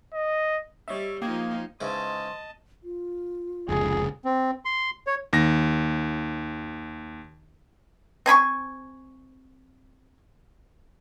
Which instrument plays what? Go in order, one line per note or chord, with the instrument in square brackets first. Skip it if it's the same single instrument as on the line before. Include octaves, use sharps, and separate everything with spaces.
[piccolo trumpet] D#5
[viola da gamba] G3 [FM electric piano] C#5 D#5 E5
[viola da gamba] F3 D#4 F4 [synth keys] A#3 [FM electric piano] G5 D#6 G#6
[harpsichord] G#2 C#3 E3 [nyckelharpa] D#5 A5 [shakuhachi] C6
[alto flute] F4
[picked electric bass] F1 C#2 [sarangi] G#4
[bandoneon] C4
C6
C#5
[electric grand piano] D#2 A#6
[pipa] C4 G#5 B5 C#6